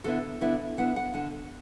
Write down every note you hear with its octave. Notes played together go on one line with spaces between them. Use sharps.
D3 B3 E4 A4
D3 B3 E4
D3 B3 E4 F#5
F#5
D3 F#5